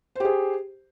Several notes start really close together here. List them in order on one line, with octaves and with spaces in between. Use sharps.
C5 G4 G#4